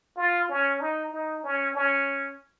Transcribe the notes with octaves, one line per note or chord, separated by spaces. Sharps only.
F4
C#4
D#4
D#4
C#4
C#4